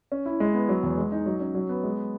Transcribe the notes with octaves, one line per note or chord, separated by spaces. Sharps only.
C#4
E4
G#3
B3
F#3
E2
G#3
D#4
F#3
C#4
F#3
B3
G#3